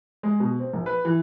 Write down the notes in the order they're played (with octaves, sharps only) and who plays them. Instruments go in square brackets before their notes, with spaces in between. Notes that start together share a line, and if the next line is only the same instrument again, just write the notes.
[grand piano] G#3
B2
C4
A#1
B4
E3